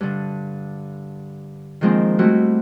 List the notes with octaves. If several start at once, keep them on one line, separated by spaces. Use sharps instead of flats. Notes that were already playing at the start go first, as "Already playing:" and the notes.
G2 D3
D#3 F3 G#3 A#3 C4
G3 A3 C4 E4 F#4